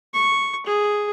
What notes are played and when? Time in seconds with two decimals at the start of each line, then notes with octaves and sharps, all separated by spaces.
0.14 C#6
0.66 G#4